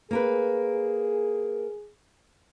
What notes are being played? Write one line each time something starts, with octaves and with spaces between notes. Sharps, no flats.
A#3 G#4 A#4 B4